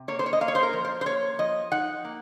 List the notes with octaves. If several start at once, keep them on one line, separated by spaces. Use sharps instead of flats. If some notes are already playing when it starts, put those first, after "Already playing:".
Already playing: C3
A#3 C#5
C5
C#5
D#5
A#3 F5
C#5
C5
A#4
F3
C5
C5
A#3 C#5
F3 D#5
D#4 F#5
A#3